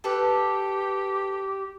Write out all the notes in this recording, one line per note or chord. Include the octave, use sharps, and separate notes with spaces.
G4 A4 B4